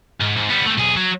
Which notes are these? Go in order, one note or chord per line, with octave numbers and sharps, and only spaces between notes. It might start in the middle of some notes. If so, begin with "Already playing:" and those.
G#2
G#2
G3 B3
A3 C4
B1 G#4
F#3